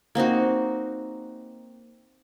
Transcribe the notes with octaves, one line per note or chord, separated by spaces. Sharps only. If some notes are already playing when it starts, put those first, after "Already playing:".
A#3 C4 D#4 F#4